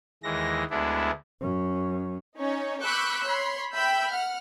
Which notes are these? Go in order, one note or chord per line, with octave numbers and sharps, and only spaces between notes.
D#2 E3 G#3 A#6
D2 G#3 B3 D4 E4
F#2 C#4
C#4 D#4 C#5
B5 C#6 D6 E6 F#6 G6
C#5 B5 C6
E5 G5 B5 E6 G6
F#5 F6